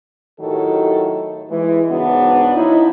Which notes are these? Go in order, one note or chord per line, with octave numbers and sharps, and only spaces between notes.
A2 D#3 F#3 G4 A4
E3 G#3
G#2 C#3 B3 D4 F#4
F3 C#4 D#4 E4